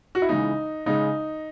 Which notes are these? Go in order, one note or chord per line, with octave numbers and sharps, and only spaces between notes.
F#4
E4
C#3 E3 G#3 D#4
C#3 G#3 D#4